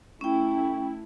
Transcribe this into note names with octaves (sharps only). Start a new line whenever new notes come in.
A3 C#4 E4 G5